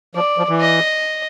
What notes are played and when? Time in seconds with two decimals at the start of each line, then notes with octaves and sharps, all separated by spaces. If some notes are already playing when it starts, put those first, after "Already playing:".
0.15 F3 D5
0.38 F3
0.49 E3
0.60 D#5